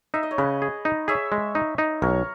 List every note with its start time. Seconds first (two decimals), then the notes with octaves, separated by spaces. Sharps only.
0.14 D#4 E5
0.23 D#5
0.31 C#5
0.38 C#3 B4 D#5
0.62 G#4
0.85 D#4
1.08 G#4 C#5 E5
1.32 G#3
1.55 D#4
1.78 D#4
2.02 B1 A#4 C#5